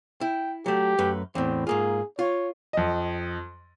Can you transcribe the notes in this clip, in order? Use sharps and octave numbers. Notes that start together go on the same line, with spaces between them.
E4 G5
F#3 A3 G4
F#2 A3 B4
E2 A2 C4
G#2 A#3 F4 G#4
F4 C#5
F2 D#5